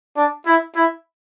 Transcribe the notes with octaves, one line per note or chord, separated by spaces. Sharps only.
D4
E4
E4